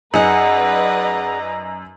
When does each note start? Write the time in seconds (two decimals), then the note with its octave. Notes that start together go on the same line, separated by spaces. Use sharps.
0.14 F#2 D#4 G#4 B4 D5 D#5 F#5 A#5